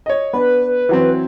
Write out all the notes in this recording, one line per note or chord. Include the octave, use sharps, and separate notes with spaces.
C#5 D#5
B3 D4 B4
E3 F#3 C4